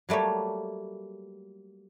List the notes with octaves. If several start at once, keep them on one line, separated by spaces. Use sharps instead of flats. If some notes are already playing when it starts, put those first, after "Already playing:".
F#3 G3 A3 A#3 C#5